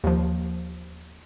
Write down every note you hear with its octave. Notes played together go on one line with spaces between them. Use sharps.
D#2 F3